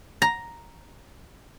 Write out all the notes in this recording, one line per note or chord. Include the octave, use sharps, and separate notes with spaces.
A#5